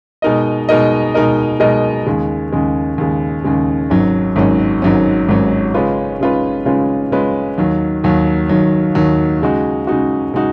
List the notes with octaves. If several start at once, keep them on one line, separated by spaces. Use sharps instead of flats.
B2 G#3 D#4 A#4 D#5
B2 G#3 D#4 A#4 D#5
B2 G#3 D#4 A#4 D#5
B2 G#3 D#4 A#4 D#5
D#2 C#3 G#3
D#2 C#3 G#3
D#2 C#3 G#3
D#2 C#3 G#3
G#1 G#2 F#3 C#4
G#1 G#2 F#3 C#4
G#1 G#2 F#3 C#4
G#1 G#2 F#3 C#4
C#3 G#3 C#4 F4 B4
C#3 G#3 C#4 F4 B4
C#3 G#3 C#4 F4 B4
C#3 G#3 C#4 F4 B4
D#2 D#3 F#3
D#2 D#3 F#3
D#2 D#3 F#3
D#2 D#3 F#3
C#3 G#3 D#4 F#4
C#3 G#3 D#4 F#4
C#3 G#3 D#4 F#4